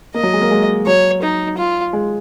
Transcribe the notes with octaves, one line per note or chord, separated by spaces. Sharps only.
A#3 D#5
F#3
G#3
A#3
G#3
F#3 C#5
D#4
F4
G#3